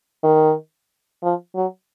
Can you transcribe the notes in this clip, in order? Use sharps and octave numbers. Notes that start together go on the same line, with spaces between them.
D#3
F3
F#3